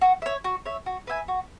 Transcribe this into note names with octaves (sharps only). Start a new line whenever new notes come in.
F#4
C#5 E5
F#4
C#5 E5
F#4
B4 E5 G#5
F#4